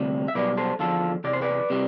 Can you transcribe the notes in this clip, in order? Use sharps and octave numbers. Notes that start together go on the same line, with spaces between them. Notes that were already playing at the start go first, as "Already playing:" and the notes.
Already playing: D2 C3 G3
E5
B1 B2 G3 B4 D5
A4 C5
E2 D3 F3 F4 A4
E2 C3 D5
C5
B4 D5
C3 G3